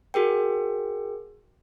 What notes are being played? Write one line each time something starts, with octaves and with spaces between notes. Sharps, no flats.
F#4 G#4 A#4 G5